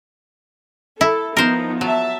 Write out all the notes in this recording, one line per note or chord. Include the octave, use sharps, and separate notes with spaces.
E4 A4
F3 B3 D#4 A#4 C5
F#3 E5 A5